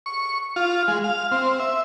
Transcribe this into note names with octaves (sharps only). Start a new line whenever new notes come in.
C#6
F4
G#3
F5
C4
E5